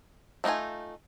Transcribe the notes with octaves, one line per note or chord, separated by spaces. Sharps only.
F#3 A3 D#4 F4 G#5